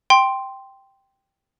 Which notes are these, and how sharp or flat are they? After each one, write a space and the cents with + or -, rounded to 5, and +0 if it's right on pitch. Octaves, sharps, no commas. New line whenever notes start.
G5 +0 C6 +0